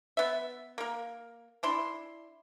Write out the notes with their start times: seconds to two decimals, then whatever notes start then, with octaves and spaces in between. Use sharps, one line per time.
0.17 B3 E5
0.78 A#3 A#4
1.63 D4 E4 C6